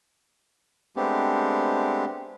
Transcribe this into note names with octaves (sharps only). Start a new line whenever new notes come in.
G#3 A3 B3 C4 D4 G4